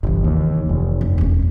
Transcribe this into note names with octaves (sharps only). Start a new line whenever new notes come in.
G1 C3 E3
D#2
F1
F#1
E1 C#4